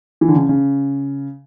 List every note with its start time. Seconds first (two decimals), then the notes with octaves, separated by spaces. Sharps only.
0.21 E3
0.28 D3
0.36 C#3
0.49 C#3